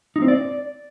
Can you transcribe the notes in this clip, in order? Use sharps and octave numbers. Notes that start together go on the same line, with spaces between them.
D#4
C4
D5